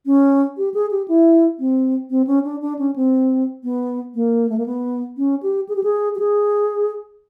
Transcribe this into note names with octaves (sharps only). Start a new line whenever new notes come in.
C#4
G4
G#4
G4
E4
C4
C4
C#4
D4
D4
C#4
C4
B3
A#3
A3
A#3
B3
C#4
G4
G#4
G4
G#4
G4
G#4